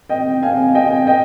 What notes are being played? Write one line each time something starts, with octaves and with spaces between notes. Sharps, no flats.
D#5 G5
F5 G#5
D#5 G5
D#5 G5